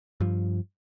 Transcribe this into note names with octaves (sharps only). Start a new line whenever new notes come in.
G2 F3